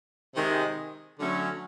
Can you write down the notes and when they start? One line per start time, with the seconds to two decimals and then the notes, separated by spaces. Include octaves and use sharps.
0.34 C3 D#3 G#3
1.20 D3 F#3 A3 C#4